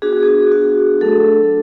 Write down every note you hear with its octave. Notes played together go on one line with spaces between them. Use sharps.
B3 D4 F#4 G#4
F#4
G#4
F#4
F#3 A3 D4 A4